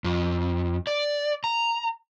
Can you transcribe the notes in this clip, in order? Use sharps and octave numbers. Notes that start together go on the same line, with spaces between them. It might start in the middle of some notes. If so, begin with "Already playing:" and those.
F2
D5
A#5